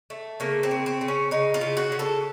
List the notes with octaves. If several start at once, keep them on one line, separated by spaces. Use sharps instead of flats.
A3
C#3 A#3
C4
C#3
C4
C#3
C#4
C#3 D#4
F4
C#3
F#4
C#3
A4